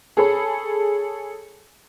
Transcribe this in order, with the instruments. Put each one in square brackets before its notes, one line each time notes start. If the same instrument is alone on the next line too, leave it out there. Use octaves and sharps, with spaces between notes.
[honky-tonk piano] G#4 A4 C#5 B5